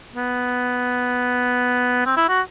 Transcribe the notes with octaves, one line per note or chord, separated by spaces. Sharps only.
B3
C4
E4
F#4